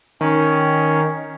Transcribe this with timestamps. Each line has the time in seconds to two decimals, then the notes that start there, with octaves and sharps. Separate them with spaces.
0.21 D#3 C#4